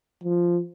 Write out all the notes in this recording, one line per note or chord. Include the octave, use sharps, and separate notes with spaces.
F3